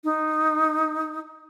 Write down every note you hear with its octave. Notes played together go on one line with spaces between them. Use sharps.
D#4